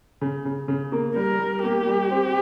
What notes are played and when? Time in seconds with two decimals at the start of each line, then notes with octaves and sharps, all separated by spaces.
0.21 C#3
0.45 C#3
0.68 C#3
0.92 A#3
1.16 G3 A#4
1.39 G3
1.63 A#3 G4
1.87 G3
2.11 C4